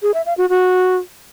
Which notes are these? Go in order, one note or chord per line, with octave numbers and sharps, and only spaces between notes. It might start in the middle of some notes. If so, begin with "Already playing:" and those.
G#4
E5
F5
F#4
F#4